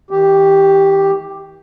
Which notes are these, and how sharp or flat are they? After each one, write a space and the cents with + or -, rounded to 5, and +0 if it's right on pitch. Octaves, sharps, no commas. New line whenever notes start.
E3 -45 G4 +0